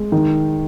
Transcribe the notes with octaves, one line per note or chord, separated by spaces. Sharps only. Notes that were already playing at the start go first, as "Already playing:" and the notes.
Already playing: G#3
D#3